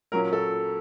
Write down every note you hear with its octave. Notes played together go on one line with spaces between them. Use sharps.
A#2 F#3 A#3 C#4 A#4
A4